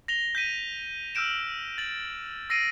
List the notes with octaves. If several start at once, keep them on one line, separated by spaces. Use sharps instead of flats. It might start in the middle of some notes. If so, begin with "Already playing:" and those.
A#6 F7 G7
G6 B6 D#7
E6 F6 G6 D7 E7
A6 F#7
E6 A#6 C7 D7 D#7